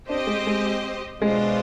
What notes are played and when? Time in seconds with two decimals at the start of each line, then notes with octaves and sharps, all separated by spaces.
0.08 C4 D4 G4 C5 D#5
0.27 G#3
0.47 G#3
1.22 B2 G#3 B3 D4 F4 C5